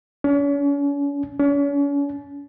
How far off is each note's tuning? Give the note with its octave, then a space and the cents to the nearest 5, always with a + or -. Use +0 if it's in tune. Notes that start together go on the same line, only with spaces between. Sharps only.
C#4 +40
C#4 +40